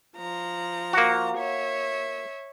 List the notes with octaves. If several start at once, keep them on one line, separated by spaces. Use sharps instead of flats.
F3 A#5
A#3 F#4
C#5 E5